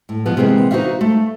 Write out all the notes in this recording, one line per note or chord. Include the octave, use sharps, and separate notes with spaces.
A2
B2 F3 B3
C3 E3 G#3 A#3 B3
D#4 F#4 C5 E5 F5
A3